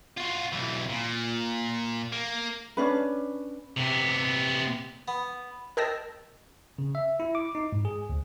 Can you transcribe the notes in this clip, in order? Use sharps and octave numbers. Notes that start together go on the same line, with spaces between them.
F4 F#4
B1 E3
A#2
A#3
C#4 D4 B4
C3 B3
B3
A#4 D#5 G5 A5 E6 A#6
C#3
E5
E4
D6
D#4
G#2
G#4
D2